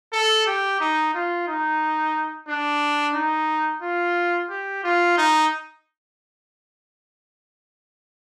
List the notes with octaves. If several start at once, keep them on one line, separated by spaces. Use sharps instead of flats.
A4
G4
D#4
F4
D#4
D4
D#4
F4
G4
F4
D#4